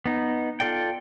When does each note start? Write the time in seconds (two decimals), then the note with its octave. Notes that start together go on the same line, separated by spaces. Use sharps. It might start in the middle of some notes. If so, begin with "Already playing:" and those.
0.06 B3 D#4
0.60 F4 A4 D5 G5